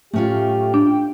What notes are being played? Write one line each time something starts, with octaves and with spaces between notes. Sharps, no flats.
A2 A3 C#4 F4 G4
D4 G5